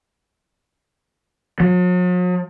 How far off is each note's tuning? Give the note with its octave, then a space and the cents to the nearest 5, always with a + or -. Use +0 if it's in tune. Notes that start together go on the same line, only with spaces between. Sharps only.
F#3 -45